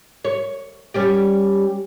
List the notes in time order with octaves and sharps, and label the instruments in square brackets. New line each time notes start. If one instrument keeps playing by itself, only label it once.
[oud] C#5
G3 C#4 G4